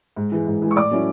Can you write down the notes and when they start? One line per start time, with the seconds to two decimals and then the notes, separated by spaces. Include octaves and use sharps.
0.16 G#2
0.32 E3 G#3
0.47 G#2
0.62 E3 G#3
0.71 C#6
0.76 A2 D5 D6
0.91 F#3 A3 C#4 E4